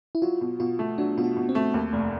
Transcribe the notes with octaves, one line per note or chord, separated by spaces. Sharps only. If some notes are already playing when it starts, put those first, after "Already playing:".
E4
F#3 F4
B2
B2 F4
A3
F#3 D4
B2 F4
F#4
B2
C4
A3
D#2
F1 A3